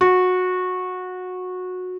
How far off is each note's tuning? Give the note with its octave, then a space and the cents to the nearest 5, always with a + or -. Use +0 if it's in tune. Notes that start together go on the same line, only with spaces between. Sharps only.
F#4 -20